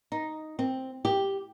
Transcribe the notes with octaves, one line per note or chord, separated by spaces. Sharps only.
D#4
C4
G4